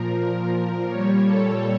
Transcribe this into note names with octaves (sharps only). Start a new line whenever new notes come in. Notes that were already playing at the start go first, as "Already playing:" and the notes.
Already playing: A#2 F3 A#4
A#2 G3 C#5
A4